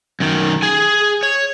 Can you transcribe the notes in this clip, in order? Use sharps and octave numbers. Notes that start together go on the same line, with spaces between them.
F#2 D#3
G#4 G#5
C#5